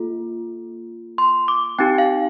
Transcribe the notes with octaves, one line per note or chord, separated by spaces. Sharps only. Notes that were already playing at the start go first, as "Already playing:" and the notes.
Already playing: A#3 F4 A4
C6
D6
C4 D#4 G4 G5
F5